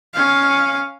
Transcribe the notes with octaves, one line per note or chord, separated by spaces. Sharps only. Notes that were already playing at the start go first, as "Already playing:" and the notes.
C#4 F5